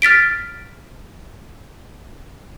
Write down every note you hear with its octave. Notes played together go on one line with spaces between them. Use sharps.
F6 A6 B6 D7